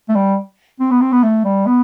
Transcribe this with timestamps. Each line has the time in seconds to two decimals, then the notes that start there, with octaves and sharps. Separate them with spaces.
0.09 A3
0.15 G3
0.80 C4
0.91 B3
1.01 C4
1.12 B3
1.23 A3
1.45 G3
1.66 B3